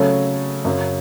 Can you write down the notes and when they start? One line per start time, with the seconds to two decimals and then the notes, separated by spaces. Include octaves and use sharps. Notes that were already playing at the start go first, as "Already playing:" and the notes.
Already playing: C#3 F#3 A3 C#4 A4
0.65 F#2 C#3 F#3